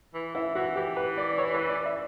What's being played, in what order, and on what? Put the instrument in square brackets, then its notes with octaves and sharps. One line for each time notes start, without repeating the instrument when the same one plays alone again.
[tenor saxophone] E3
[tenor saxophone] E3 [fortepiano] E4
[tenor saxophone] E3 [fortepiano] F#4
[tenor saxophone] E3 [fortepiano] G4
[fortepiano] B4
D5
C#5
B4
D5
E5